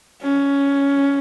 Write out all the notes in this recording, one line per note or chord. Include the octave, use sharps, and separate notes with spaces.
C#4